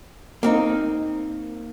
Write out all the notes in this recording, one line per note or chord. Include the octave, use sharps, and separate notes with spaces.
A#3 C4 D#4